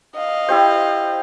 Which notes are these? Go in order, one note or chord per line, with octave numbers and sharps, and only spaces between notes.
D#5 F5
E4 G4 C5